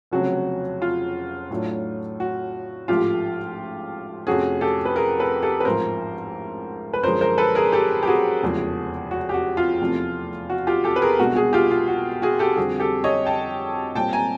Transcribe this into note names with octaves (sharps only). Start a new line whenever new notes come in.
F1 F2 C#3 F#3 F#4
F4
A2 F#3 A3 D4 F4
F#4
A1 G#2 F3 A3 F4 G4
F2 C3 F3 A3 C#4 F#4 G#4
G4 A4
B4
G#4 A#4
A4 B4
G4 A4
B4
A1 G#2 F3 A#4 C5
B4
F#2 D3 F3 G#3 A#4 C5
A#4 C5
A4 B4
G#4 A#4
G4 A4
G4
F#4 G#4
F1 E2 C#3 F3 G#3
F#4
G4
F#4
F4
F1 E2 C3 F3 A3
F#4
F4 G4
G4 A4
B4
G#4 A#4
C2 B2 G#3 B3 D4 F#4
F#4 G#4
F4 G4
F4
F#4
F#4 G#4
G4 A4
F2 D3 G3 C4 F#4 G#4
G4 A4
C#5 D#5
G5 A5
A#2 G3 C4 G5 A5
G#5 A#5